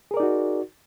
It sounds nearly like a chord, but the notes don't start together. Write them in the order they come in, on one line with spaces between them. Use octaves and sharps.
G#4 A#4 D5 D#4 F#4